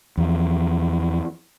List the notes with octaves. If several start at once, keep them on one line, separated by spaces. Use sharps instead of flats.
E2 F3